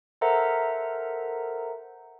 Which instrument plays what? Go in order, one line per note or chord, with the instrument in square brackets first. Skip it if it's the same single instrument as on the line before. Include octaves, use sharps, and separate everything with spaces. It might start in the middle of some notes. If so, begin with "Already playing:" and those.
[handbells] A4 A#4 C5 E5 F#5 A#5